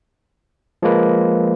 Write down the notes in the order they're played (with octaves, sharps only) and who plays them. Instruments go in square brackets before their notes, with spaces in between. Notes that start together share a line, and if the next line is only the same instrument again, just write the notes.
[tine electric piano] F3 G#3 A#3 B4